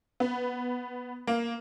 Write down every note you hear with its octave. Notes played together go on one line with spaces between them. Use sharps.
B3
A#3